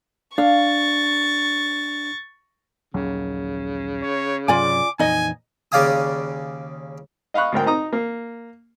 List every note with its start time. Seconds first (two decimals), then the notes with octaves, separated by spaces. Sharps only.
0.38 D4 F5 C#6 A6
2.94 A#1 D#2 C#3 F#3
4.02 C#5
4.48 G2 C3 F#3 F4 D5 G#5 D6
4.99 F2 A#2 E3 D#4 D#5 G#5
5.72 D#2 C#3 D5 F5 G#5 D#6
7.34 D#5 F5 B5 C#6 F#6
7.52 D2 G#2 A#4 G5
7.66 D#4 A#5 D#6
7.93 A#3